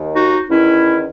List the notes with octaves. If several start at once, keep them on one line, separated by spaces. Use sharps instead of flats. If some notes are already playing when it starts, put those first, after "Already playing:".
Already playing: D#2 D#3
D#4 F#4
E2 D#3 C#4 E4